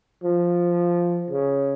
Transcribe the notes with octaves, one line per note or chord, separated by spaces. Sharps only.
F3
C#3